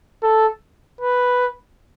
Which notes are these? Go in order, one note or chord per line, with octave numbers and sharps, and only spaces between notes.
A4
B4